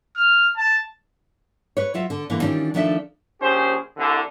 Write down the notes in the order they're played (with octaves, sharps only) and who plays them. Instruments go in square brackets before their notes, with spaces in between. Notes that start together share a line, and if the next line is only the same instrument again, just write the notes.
[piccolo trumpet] F6
A5
[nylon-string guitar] B4 C#5
F#3 F4 E5
D3
D3 E3 A#3
D#3 E3 G3 C#4 D4 F4
D#3 F3 A3 D4 A4 E5
[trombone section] A#1 C#4 G4 G#4 C5
C2 D3